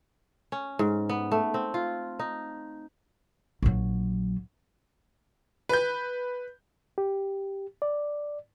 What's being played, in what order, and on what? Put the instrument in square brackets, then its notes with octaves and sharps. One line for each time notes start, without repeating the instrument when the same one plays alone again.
[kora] C#4
G#2
B3
A3
C4
F4
D#4
[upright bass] A#1 F#3
[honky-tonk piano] B4 G6
[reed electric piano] G4
D5